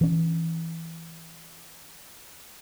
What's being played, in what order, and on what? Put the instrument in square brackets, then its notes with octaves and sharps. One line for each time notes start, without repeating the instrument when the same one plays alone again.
[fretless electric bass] E3 C#4